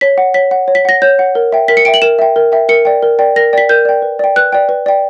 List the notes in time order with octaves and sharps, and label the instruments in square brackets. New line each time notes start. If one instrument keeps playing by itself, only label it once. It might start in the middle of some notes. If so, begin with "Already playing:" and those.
[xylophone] C#5 B6
F#5
C#5 B6
F#5
C#5
B6
F#5 A#6
C#5 G6
F#5
A#4
E5 G5
A#4 B6
C#7
E5 G5 D7
F#7
A#4 E7
E5 G5
A#4
E5 G5
A#4 C#7
D5 G5
A#4
D5 G5
A#4 A#6
D5 G5 B6
A#4 G6
D5 G5
B4
D5 G5
B4 F#6
D5 G5
B4
D5 G5